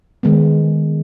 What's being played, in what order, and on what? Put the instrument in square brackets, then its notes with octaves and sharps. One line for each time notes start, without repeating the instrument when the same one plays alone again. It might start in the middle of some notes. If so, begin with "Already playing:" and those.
[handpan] D#3 G#3 B3